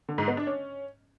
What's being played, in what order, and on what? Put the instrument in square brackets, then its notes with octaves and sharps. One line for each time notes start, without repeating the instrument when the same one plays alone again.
[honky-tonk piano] D3
G#2
B3
D4
C#4